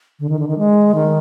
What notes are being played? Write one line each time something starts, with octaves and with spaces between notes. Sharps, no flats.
D3
D#3
D3
D#3
G#3
D#3